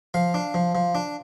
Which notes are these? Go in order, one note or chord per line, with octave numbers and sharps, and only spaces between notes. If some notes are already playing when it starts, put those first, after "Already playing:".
F3 F5
D4
F3
F3
D4